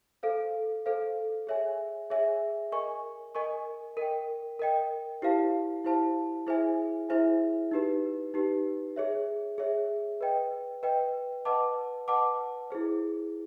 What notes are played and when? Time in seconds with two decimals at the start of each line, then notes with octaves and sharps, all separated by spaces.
0.23 A4 C5 F5
0.86 A4 C5 F5
1.47 G#4 C#5 E5 G#5
2.10 G#4 C#5 E5 G#5
2.72 A#4 D#5 G#5 C#6
3.35 A#4 D#5 G#5 C#6
3.97 A#4 D#5 G5
4.59 A#4 D#5 G5
5.22 E4 G4 C5 F5 A5
5.85 E4 G4 C5 F5 A5
6.47 E4 G#4 C5 E5 G#5
7.09 E4 G#4 C5 E5 G#5
7.71 D#4 G4 B4
8.34 D#4 G4 B4
8.96 G#4 C#5 E5
9.58 G#4 C#5 E5
10.21 B4 D#5 G5
10.83 B4 D#5 G5
11.45 B4 D#5 F#5 A5 D6
12.08 B4 D#5 F#5 A5 D6
12.70 E4 G#4 C5